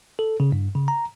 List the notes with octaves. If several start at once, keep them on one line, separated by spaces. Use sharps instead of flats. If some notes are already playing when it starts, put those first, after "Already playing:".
A4
C#3
G2
C#3
A#5